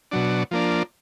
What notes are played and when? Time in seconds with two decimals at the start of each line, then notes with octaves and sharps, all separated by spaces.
0.11 B2 F#3 D4
0.51 F3 A#3 D4